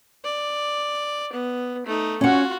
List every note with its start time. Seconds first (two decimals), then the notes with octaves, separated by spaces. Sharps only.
0.24 D5
1.33 B3
1.86 A3 D#4
2.21 C#4 F4 F#4 F#5